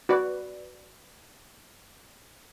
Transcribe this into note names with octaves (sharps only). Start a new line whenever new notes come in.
F#4 B4 D5